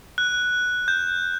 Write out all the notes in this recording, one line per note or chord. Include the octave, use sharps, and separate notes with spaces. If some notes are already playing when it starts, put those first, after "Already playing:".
F#6
G6